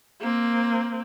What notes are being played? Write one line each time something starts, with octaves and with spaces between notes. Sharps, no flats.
A#3 C4